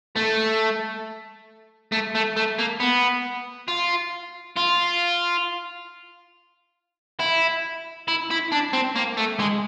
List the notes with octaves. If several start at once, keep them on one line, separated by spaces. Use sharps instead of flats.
A3
A3
A3
A3
A#3
B3
F4
F4
E4
E4
E4
D4
C4
A#3
A3
G#3